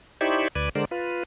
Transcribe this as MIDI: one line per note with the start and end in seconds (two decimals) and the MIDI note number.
0.21 0.48 63
0.21 0.48 64
0.21 0.48 67
0.21 0.48 72
0.21 0.48 74
0.21 0.48 85
0.55 0.69 38
0.55 0.69 71
0.55 0.69 74
0.55 0.69 80
0.75 0.85 50
0.75 0.85 56
0.75 0.85 70
0.75 0.85 72
0.75 0.85 74
0.91 1.23 65
0.91 1.23 71